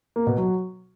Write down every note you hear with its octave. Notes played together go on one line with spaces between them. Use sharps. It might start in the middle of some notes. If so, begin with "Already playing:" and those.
A#3
B2
F#3